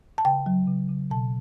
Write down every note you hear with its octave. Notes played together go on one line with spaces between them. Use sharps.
A5
C#3 G5
F#3
C#3
C#3
B2 A5